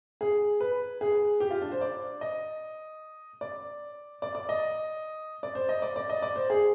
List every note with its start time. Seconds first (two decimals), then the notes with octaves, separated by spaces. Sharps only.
0.21 G#4
0.61 B4
1.01 G#4
1.40 G4
1.51 F4
1.62 D4
1.72 C5
1.81 D5
2.21 D#5
3.41 D5
4.22 D5
4.35 D5
4.49 D#5
5.43 D5
5.55 C5
5.69 D#5
5.82 D5
5.96 D5
6.10 D#5
6.22 D5
6.36 C5
6.50 G#4